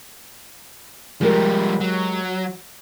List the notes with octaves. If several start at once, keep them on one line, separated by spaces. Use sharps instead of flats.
F3 G3 G#3 G4 A#4
F#3